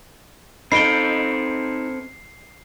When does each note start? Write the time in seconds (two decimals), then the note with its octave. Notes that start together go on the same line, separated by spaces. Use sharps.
0.72 C4 D#4 A4 B5 C7 D7 G7